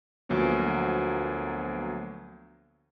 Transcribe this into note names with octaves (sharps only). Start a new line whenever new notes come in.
D2 F3 F#3 A#3 B3